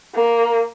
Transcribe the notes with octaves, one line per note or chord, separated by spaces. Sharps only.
A#3